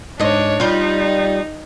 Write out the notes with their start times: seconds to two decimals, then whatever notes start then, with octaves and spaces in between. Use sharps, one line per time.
0.19 G#2 D4 C#5 D#5
0.60 G3 D#4 F4